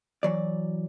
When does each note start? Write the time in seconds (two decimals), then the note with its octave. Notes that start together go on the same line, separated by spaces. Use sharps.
0.23 E3 F#3 D5